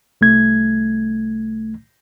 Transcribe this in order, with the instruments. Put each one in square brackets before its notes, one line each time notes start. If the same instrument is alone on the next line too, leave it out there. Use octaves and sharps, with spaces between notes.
[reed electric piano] C2 A3 G#6